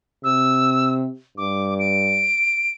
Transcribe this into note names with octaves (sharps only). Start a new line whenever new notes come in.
C3 E6
G2 D6
D7